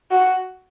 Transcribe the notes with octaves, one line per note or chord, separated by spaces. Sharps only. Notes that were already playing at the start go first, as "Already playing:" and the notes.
F#4